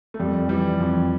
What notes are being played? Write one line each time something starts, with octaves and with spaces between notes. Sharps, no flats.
A3
F2 G3
E3 G3
F2